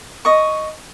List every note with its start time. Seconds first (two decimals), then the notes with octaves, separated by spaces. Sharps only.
0.25 D#5 C#6